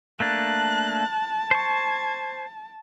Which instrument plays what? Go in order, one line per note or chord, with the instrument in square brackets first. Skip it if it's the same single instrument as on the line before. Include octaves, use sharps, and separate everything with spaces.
[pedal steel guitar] A3 A#3 D4 [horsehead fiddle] A5 [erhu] F#6
[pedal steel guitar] C5 C#6 [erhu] G#6